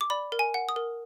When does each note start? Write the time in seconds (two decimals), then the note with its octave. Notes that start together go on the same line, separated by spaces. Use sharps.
0.01 D6
0.10 D5 B5
0.32 A#4
0.39 G#5
0.54 F#5
0.69 D#6
0.76 A#4